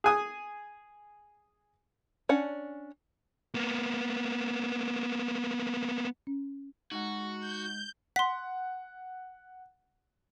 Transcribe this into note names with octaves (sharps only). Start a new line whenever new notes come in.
G#4 G#5 D#6
C#4 D4 F#5
A#3 B3
C#4
G#3 D#4 F#4 F#5
G6
F#5 C6 B6